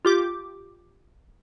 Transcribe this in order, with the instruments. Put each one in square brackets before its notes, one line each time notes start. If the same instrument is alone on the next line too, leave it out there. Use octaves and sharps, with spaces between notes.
[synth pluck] F4 G4 D6